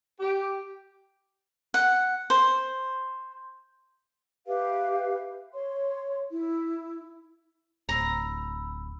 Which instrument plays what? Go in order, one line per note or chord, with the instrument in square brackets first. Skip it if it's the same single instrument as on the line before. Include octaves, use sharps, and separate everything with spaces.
[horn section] G4
[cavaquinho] F#5
C5
[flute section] G4 B4 E5 F5
C#5 C6
E4
[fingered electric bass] D1 [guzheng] A#5 [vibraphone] B5 E6